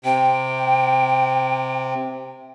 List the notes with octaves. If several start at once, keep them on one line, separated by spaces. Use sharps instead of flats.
C3 G5